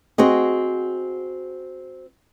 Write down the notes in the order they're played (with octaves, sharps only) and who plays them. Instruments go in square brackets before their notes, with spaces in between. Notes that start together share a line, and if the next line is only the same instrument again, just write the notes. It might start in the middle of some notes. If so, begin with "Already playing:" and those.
[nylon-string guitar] C4 F#4 G#4 D#5